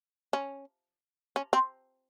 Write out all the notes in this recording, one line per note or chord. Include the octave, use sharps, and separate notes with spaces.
C#4
C#4
C4